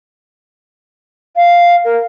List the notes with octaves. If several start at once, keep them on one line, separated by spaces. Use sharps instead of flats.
F5
A#4